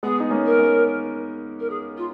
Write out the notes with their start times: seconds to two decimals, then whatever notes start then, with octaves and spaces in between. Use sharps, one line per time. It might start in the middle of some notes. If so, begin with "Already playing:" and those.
0.03 G#3 B3 G#4
0.20 D#4
0.30 A#3 C#4
0.45 A#4
0.59 A#3 C#4
1.59 A#4
1.70 G#4
1.97 F4